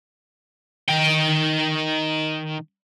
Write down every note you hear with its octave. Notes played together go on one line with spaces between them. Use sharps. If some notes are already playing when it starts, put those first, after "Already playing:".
D#3 G5